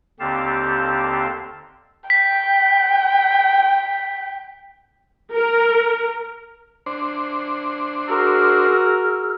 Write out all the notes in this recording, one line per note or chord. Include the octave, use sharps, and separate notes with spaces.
D#2 D3 C4 G4 F5 A5
G5 B6
A#4
D4 C5
F#4 G#4 A#4 E6 F6